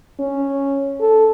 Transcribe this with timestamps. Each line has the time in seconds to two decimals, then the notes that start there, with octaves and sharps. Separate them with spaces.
0.20 C#4
1.01 A4